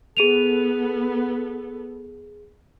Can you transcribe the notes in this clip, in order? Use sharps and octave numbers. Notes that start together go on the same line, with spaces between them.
B3 G#4 A4 D#7 F7